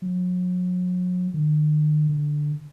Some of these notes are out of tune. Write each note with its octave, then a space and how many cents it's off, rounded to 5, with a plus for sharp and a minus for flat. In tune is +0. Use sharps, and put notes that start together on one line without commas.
F#3 -40
D#3 -45
D3 +10